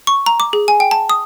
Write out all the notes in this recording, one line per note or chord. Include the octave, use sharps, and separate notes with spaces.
C#6
A#5
D6
G#4
G#5
G5
A5
D#6